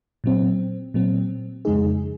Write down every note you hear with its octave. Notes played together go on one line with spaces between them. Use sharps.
A#2 F#3 C4
A#2 F#3 C4
F2 C#3 G#3 D#4 G#4